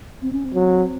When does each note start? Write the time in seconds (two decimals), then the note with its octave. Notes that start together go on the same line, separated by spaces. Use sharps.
0.22 C4
0.33 C#4
0.45 C4
0.54 F#3